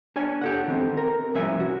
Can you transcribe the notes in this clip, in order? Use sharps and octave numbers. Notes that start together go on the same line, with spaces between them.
D4 C#5 G#5
G4 A4 F#5
D#3 C4
A#4
C2 F3 C#4 E5 G#5
F#4